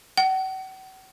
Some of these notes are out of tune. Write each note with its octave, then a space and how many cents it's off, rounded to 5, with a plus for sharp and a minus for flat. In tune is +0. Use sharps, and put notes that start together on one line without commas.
F#5 +40